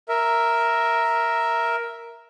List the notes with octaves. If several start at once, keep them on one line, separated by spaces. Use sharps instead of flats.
A#4 E5